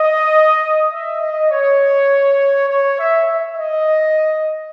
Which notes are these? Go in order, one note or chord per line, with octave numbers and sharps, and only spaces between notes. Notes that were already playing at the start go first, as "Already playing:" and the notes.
Already playing: D#5
E5
D#5
C#5
C#5
E5
E5
D#5